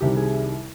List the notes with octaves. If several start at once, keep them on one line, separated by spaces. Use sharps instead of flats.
C2 C3 D#3 G3 G4
G#4